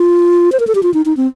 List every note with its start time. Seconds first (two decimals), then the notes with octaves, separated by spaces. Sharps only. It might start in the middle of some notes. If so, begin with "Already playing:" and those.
Already playing: F4
0.52 C5
0.60 A#4
0.67 A4
0.75 G4
0.83 F4
0.94 D#4
1.06 D#4
1.17 C4